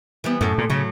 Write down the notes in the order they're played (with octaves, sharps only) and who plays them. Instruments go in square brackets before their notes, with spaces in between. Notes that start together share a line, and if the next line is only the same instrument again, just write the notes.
[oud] E3 G3 B3
[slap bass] F#2 [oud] A2 A4
[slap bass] A#2
[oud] A2 F#3 [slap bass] C#3